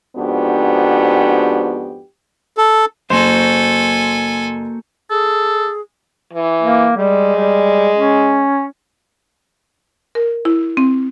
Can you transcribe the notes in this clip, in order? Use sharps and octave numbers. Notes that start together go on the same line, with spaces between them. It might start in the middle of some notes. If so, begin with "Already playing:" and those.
F2 G#2 B3 D4 F#4 G4
A4
F#1 A#3 F#4 A4 C5 G#5 C6 E7
G#4 A4
E3
A#3
G3 G#3
G3
C#4
A#4
E4
C4